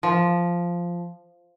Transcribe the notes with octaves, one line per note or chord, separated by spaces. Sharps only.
F3